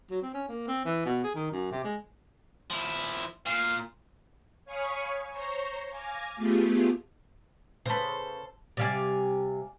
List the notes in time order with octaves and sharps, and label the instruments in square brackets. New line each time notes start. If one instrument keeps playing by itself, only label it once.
[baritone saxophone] F#3
C4
C#4
A#3
C4
E3
B2
G#4
D#3
F#2
C3
G#3
[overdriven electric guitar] F3 E4
[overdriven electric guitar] A#2 [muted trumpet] F5
[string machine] C#5 F5 G#5 B5 C#6 D#6
C5 C#5 A#5 C#6
F5 G#5 D6 F6 G#6 A#6
A3 B3 F4 G4 G#4
[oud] C#3 B4 [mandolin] A4 C5
[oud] C3 G3 C4 [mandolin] D5 F5 G#5